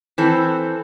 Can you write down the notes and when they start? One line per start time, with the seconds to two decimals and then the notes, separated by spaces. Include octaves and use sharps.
0.18 E3 C4 A4